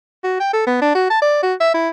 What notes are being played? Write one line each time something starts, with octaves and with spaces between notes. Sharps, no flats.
F#4
G5
A4
B3
D4
F#4
A5
D5
F#4
E5
E4